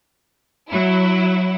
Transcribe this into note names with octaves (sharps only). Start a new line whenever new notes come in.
F#3 E4